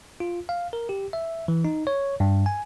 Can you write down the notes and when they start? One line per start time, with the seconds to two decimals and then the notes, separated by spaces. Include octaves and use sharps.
0.20 F4
0.49 F5
0.73 A#4
0.89 G4
1.13 E5
1.48 E3
1.65 D#4
1.87 C#5
2.20 G2
2.46 G#5